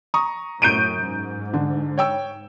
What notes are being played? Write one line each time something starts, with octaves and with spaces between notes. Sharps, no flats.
A#5 C#6 D#6
F#2 A2 G6 D7 D#7
G#2
D3
C#5 G5 E6